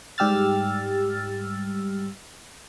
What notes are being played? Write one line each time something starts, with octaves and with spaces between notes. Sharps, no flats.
G#2 G3 G4 E6 F6 A6